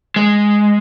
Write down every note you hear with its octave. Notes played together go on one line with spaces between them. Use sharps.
G#3